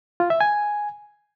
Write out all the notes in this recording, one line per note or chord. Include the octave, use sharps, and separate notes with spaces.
F4
E5
G#5